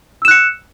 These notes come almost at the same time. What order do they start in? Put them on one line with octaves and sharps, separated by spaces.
E6 E7 F#6 C#7